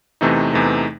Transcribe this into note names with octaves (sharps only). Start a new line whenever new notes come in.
E2 C3 E3 A3 D#4
E2 C3 E3 A3 D#4